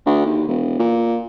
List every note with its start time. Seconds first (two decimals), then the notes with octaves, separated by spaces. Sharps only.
0.06 D2
0.26 D#2
0.48 E1
0.79 A#2